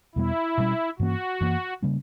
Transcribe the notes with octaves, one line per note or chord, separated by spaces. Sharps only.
E2 B2 G3 B3 E4
B2 G3 C#4
G2 E3 A#3 C#4 F#4
F#2 E3 A#3
C#3 G3 A#3 C#4